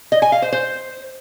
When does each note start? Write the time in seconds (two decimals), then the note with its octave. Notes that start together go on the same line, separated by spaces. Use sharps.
0.12 D#5
0.22 G#5
0.32 F5
0.42 C5
0.52 C5